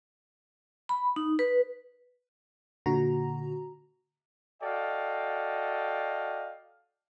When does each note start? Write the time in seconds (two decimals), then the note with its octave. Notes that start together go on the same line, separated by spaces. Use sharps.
0.89 B5
1.16 D#4
1.39 B4
2.86 A#2 D3 F#4 A#5
4.62 F#4 A4 D5 D#5 F5 G5